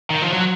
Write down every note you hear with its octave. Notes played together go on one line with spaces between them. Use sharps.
D#3
F3
F#3